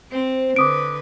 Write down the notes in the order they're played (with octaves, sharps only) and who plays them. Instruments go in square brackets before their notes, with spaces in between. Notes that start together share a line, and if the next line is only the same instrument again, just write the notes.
[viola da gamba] C4 [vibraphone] C5
[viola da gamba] D3 B4 [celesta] D6 D#6 D7